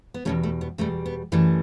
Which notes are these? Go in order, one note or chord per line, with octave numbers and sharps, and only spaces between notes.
B3
E2 B2 G3 A3 C#4
A3
B3
E2 B2 G3 A3
B3
F#2 E3 G3 A3